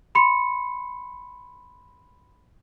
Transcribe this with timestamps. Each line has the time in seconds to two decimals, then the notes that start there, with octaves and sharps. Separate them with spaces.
0.15 B5 C6 C#7